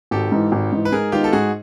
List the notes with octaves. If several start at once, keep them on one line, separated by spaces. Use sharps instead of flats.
G#1 G4 A4
G#2 E3
G#1
G#2 E3
B4
G#2 G#4 A#4
D#3 G#3 B3 D#4 F4 G4
A4
G#2 F#4 G#4